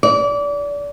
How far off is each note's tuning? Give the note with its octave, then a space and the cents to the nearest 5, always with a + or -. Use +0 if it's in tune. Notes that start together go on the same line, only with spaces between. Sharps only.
D5 -30